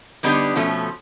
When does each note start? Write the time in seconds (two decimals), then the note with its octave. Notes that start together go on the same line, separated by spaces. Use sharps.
0.23 D3 G3 B3 D4 D#4 G4
0.55 B2 F3 A3 C#4